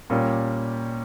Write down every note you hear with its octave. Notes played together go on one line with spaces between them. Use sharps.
A#2 G3 A#3 C#4